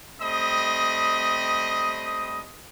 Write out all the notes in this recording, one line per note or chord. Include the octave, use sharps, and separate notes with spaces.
G3 A3 C4 D#5 B5 D#6